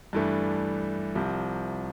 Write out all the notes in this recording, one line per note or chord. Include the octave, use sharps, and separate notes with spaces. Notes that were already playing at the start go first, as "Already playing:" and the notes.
G2 E3 A3 D4
C2 C3 F3